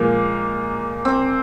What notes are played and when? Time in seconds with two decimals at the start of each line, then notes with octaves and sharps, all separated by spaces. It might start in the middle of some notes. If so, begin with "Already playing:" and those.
Already playing: A#2 F3 G#3 A#3
1.05 C4